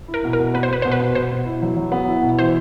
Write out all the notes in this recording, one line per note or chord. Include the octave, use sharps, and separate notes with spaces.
E4
A#4
B2
A#4
B2
B3 B4
C5
B3 B4
B2 C5
B4
B2
B2 C5
B2
E4
F#3
F#3
B3
E4
B2
E3 C5